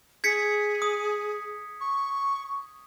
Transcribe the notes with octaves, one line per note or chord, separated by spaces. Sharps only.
G#4 G#6 B6 C#7
D#6
C#6